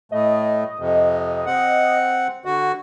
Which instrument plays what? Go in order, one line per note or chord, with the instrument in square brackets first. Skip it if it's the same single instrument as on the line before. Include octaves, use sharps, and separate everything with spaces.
[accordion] A2 A3 [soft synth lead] D#5
[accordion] F2 C3
C4 F#5
D3 F#4